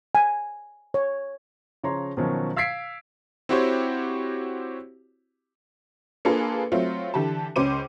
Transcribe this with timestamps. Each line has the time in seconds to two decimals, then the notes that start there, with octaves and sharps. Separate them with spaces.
0.15 G#5
0.94 C#5
1.83 C#3 F3 C#5 A#5 C6
2.17 B2 D#3 F3 F#3 C#4
2.56 F5 E6 G#6 B6 C7 D7
3.49 C4 E4 F#4 G4 C5 C#5
6.25 A#3 D4 F4 G#4 A4 B4
6.72 F#3 A3 C4 F4
7.14 D3 E3 G4 A5
7.56 C#2 C#3 C#4 C5 D6 D#7